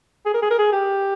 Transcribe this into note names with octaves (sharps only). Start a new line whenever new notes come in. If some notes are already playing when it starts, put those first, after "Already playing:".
G#4
A#4
G#4
A#4
G#4
G4